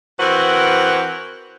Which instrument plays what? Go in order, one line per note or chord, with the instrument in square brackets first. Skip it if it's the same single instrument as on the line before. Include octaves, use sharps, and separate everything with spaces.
[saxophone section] E3 C4 F#4 A#4 B4